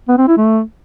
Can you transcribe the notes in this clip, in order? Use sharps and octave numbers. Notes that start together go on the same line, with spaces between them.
B3
C4
E4
A3